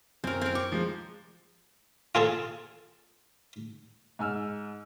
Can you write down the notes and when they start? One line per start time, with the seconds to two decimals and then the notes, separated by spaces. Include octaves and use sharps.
0.24 F#2 C4 A#4
0.41 C4 A#4
0.55 C#6 D6
0.72 F3 G#3
2.15 F4 G#4 A4 A5
4.19 G#2 G#5 E6 F6